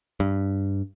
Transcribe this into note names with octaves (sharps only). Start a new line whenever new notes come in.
G2